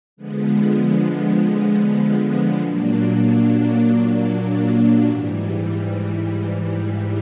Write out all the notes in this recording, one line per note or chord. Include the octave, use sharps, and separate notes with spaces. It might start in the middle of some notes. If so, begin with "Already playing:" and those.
D3 F3 G#3 B3
A#2 F#3 A#3 D4
G#2 E3 G3